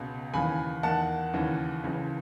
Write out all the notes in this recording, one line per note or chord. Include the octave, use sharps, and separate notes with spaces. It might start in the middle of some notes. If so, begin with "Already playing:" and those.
Already playing: C#2 B2
D#2 C#3 E3 G#5 B5
E2 D#3 F#5 A5
D#2 C#3 E3
C#2 C#3 E3